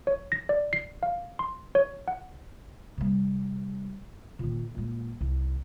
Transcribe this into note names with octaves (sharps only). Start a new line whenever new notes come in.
C#5
A#6
D5
C7
F5
C6
C#5
F#5
C3 G3
A#2 D#3
A#2 G#3
C2